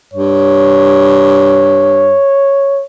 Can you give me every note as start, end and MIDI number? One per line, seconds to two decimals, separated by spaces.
0.14 2.17 43
0.14 2.84 73